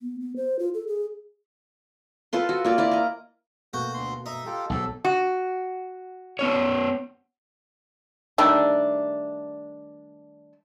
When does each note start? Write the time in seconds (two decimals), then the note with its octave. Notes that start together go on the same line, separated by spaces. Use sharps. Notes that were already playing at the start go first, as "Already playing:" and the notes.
0.02 B3
0.20 B3
0.36 C5
0.59 F4
0.74 A4
0.87 G#4
2.33 F4 A4 B4 C6
2.49 F#4
2.65 A#3 F4 D5
2.78 E4 A#4 D5
2.91 D#5 A#5
3.74 B2 A3 A#3 F#4 G6
3.94 D2 C6
4.26 D#4 E5
4.46 F4 G4 A4
4.70 B1 G#2 A4
5.05 F#4
6.39 B3 C#4 C#5
8.38 D#3 G3 A3 D4